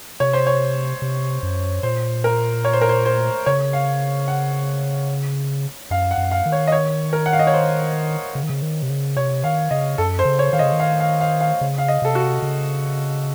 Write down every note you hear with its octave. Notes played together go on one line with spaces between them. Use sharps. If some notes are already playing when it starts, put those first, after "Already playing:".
C3 C#5
C5
C#5
C3
F#2
A#2 C5
A#4
C#5
C5
A#4
C5
C5
C#3 C#5
F5
F#5
F#2 F5
F#5
F#2
F5
D#3
C#5
D#5
C#5
A#4
F#5
F5
D#5
C#5
C5
C#3
D#3
C#3
D#3
C3
C#3
C3 C#5
D#3 F5
C#3 D#5
F#2 A4
C5
C#3
C#5
D#3 F5
D#5
C#3
D#3
F5
F5
F5
F5
C#3
F5
D#5
C3 A4
F#4
C#3